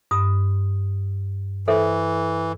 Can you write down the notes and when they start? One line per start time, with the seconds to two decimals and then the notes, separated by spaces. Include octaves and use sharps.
0.11 G2 D#6
1.68 E3 A4 C5 E5